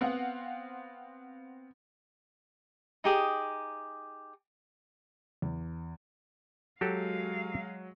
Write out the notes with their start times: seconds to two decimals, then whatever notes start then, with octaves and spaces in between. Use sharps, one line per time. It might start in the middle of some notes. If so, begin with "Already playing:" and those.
0.01 B3 C4 F5 F#5
3.04 D#4 G4 G#4 D#6
5.42 E2
6.81 F#3 G#3 F#4 G4 A4 F5